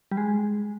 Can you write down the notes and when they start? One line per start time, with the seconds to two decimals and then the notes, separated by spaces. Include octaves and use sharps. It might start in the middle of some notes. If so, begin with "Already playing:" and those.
0.12 G3
0.17 G#3